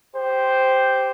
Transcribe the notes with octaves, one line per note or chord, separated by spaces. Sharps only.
G4 C5